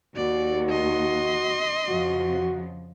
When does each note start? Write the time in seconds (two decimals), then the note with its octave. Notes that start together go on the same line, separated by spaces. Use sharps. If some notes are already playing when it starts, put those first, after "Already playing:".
0.16 D#2 F#4 D5
0.69 D#5 C6
1.88 F2 C#3 F3 F#4